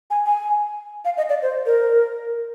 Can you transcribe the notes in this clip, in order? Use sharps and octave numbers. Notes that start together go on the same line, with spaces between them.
G#5
G#5
F5
D#5
D5
C5
A#4